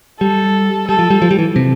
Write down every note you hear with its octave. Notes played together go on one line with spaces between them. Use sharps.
G3 A4
G3 A4
F3
G3
F3
G3
E3
C3